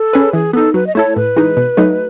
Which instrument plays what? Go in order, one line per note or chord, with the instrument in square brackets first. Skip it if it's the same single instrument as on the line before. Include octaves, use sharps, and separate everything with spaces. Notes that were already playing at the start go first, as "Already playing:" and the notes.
Already playing: [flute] A4
[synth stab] C#4 G#4 B4
[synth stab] E3 [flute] G#4
[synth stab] B3 D#4 [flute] A4
[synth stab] F#3 [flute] B4
[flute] D#5
[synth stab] A3 E4 A4 [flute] C#5
[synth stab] A2 [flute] B4
[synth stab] E3 G#3 D#4
B2
F#3 A3 D#4